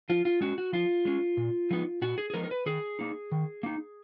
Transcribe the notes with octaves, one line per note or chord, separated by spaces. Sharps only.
F3 F4
F4
G#3 C#4 F#4
F#4
F3 F4
G#3 C#4
A#2
F3 G#3 B3 D#4
A#2 F#4
G#4
G#4
F3 G#3 B3 D#4 A#4
A#4
B4
D#3 G#4
A#3 D#4
D#3
A#3 D#4